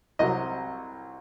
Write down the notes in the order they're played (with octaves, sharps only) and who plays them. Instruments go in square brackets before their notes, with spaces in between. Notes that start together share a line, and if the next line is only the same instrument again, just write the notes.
[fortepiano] C2 C3 F#3 D#5